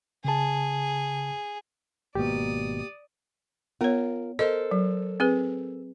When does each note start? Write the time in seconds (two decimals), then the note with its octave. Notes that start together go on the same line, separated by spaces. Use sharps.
0.25 C#3 G#4 A5
2.15 G#1 B2 A#3 G4 D5 D#6
3.81 B3 F4 A#4 C#5
4.39 A4 A#4 C5 D#5
4.71 F#3
5.20 C4 G#4 B4